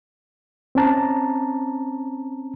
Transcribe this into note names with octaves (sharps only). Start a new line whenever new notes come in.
C4 C#4 A5 A#5